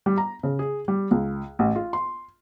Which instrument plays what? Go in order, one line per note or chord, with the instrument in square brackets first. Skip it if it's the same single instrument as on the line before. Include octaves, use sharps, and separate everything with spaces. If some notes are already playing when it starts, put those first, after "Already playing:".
[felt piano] G3
A#5
C#3
G#4
G3
C#2
A1
F4
C6